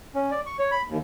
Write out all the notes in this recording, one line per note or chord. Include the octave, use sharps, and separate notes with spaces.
C#4
D5
C#6
C#5
B5
D#2